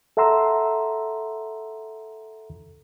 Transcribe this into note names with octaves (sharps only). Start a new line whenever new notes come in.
A4 E5 F#5 A#5 C6 E6